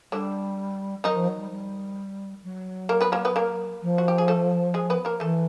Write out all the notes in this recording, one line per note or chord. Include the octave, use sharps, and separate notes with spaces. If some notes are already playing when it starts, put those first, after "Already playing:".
D3 G3 D4
D#3 F#3 D#4
F3
F#3
G3
G3
F#3
A#3 A#4
B3 B4
A#3 A#4
B3 B4
A#3 A#4
F3
F#4
G4
G#4
A3 A4
G#3 G#4
B3 B4
A#3 A#4
E3 A3 A4